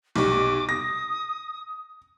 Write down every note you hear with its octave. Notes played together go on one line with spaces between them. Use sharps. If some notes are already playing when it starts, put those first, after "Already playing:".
B1 G3 C#6 D6
D#6 A#6